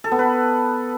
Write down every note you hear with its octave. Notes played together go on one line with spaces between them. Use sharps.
A4
B3
B4